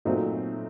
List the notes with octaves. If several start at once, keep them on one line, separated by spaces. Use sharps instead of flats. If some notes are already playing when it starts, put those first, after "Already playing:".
A#2 F#3 A3 C4 D#4